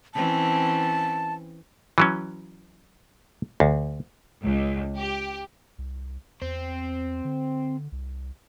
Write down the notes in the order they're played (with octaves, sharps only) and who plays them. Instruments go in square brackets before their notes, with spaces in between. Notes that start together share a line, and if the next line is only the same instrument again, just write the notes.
[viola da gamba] E3 C4 C#4 [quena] A5
[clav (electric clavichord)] E3 F#3 C#4
D2
[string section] C#2
G4
[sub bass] C2
[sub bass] E2 [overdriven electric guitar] C4
[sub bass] D3
C2